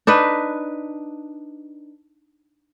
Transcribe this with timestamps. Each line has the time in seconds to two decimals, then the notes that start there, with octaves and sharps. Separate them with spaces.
0.07 D4 D#4 B4